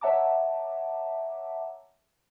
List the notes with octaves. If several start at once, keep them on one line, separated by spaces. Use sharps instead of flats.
C#5 E5 F#5 A5 A#5 D6